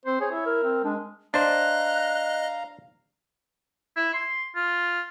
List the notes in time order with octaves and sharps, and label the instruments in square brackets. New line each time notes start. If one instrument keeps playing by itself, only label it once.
[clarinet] C4 [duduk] C5
[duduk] G#4 [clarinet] C#5
[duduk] E4
[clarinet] A#4
[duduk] C4
[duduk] G#3 [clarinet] D4
[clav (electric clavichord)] D4 C5 [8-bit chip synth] D#5 [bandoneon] F5 A#5 [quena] F#6
[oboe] E4
C6
F4